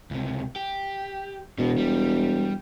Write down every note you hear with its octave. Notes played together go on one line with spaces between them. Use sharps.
C#2 C3
G4
E1 B2
G3